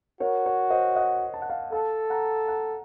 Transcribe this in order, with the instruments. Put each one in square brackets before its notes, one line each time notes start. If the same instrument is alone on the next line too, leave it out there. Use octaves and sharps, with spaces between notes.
[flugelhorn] F#4 [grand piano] A#4 C#5
[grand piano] A#4 C#5
C5 D#5
D#5 F#5
A5
F#5
F5 A5
[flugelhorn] A4 [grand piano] F5 A5
[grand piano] F#5 A#5
F#5 A#5